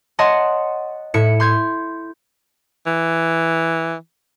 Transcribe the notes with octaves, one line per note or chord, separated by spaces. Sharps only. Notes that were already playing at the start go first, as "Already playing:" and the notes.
C#5 D#5 F#5 A5 C6
A2 E4 C#7
C6 G6 G#6
E3